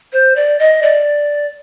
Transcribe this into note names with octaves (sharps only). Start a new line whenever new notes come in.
C5
D5
D#5
D5